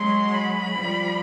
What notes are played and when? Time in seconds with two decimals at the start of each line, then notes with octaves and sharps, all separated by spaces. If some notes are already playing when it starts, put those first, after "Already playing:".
Already playing: F#3 G#3 C6
0.34 B5
0.76 F3 G3